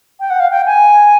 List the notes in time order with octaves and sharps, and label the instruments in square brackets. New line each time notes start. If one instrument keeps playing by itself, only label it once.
[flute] G5
F#5
F5
G5
G#5